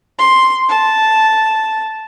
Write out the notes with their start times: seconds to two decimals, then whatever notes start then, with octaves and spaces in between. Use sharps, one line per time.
0.18 C6
0.69 A5